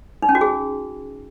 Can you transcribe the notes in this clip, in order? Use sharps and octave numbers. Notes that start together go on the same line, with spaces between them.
D#4
C#4
F#4
G#4